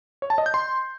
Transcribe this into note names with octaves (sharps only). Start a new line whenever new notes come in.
C#5
A5
D#5
G6
C6